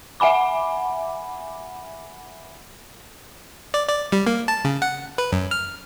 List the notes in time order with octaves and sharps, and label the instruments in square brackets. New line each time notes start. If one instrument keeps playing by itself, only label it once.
[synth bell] E5 F#5 G#5 B5 D6
[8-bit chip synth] D5
D5
G3
A#3
A5
C#3
F#5
B4
F#2
F6